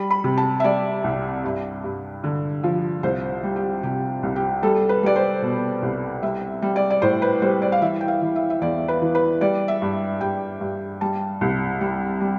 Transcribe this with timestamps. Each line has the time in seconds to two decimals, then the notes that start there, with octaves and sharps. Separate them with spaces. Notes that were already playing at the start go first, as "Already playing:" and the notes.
Already playing: G3 B5
0.10 B5
0.24 C3
0.38 A5
0.60 E5
0.64 G3 D5
1.04 C2
1.44 G2
1.84 G2
2.24 D3
2.63 F3
3.03 C2 C5
3.43 G3
3.56 G4
3.83 C3 G4
4.23 C2
4.36 G4
4.63 G3 A4
4.89 B4
5.03 G3 D5
5.16 C5
5.42 B2
5.82 C2
6.22 G3 E5
6.62 G3
6.76 D5
6.90 D5
7.02 A2 C5
7.22 B4
7.42 G3 C5
7.62 D5
7.72 F5
7.81 E3 E5
8.01 G5
8.08 F5
8.22 E3
8.36 E5
8.50 E5
8.61 E2 D5
8.88 B4
9.02 E3
9.15 B4
9.41 G3 D5
9.68 E5
9.82 G2
10.21 G2 G5
10.61 G2
11.01 G3 A5
11.41 C2
11.81 G3
12.21 G3